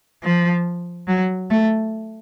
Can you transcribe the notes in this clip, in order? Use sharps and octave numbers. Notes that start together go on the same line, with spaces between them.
F3
F#3
A3